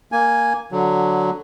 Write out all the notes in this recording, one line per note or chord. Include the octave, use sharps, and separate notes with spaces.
A#3 G#5
D3 F#3